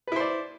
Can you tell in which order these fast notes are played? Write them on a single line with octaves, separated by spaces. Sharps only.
B4 E4 C5 D5